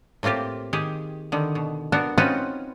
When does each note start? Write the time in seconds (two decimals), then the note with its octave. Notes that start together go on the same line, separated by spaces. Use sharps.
0.23 A2 A#3 C4 F4 G4
0.73 D#3 G4 G#4
1.32 D3 D#3
1.55 B2
1.92 B3 D4 F#4 A#4
2.18 C4 C#4 D#4 F4 F#4 B4